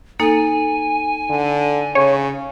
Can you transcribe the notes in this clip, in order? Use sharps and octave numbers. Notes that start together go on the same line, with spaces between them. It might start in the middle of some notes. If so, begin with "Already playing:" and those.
A#3 D#4 A4 G#5
D3
C#3 C#5